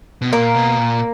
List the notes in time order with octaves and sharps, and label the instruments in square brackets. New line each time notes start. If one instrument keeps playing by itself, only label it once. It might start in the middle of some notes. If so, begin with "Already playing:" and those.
[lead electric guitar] B2
[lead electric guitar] A#2 [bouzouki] A#3
[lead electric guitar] B2
A#2